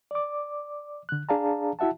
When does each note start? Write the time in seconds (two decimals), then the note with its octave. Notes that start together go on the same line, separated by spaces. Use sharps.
0.11 D5 D6
1.09 D3 F#6
1.29 D4 G#4 D5 F5 A5 A#5
1.79 E4 F#4 E5 F#5 A5